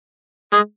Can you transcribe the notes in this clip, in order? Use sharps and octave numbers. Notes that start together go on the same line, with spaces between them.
G#3